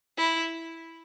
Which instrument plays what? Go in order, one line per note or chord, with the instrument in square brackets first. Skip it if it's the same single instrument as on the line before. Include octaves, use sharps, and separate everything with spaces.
[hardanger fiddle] E4